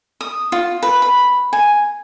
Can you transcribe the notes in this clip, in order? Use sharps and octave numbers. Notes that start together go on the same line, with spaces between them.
D#6
F4
B4
B5
G#5